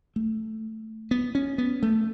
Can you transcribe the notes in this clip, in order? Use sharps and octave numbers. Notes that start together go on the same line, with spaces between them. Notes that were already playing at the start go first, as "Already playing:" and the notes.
A3
B3
C#4
B3
A3